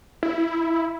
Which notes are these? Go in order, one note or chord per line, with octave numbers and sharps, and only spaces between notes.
E4